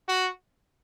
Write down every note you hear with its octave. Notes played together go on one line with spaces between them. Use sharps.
F#4